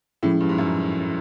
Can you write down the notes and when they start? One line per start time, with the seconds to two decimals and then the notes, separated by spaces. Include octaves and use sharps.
0.23 A2 F3 G#3 C#4 E4 G#4
0.40 G2
0.49 G#2
0.58 F#2